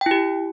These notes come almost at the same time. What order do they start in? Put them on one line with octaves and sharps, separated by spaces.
G5 E4 G4